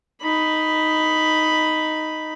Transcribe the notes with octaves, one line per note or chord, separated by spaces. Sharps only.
D#4 B5